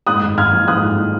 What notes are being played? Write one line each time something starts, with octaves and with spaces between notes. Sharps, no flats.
G#2 D#6 F#6
G#1
G#1 F6 G#6
F3
G#2 D#6 F#6
G#1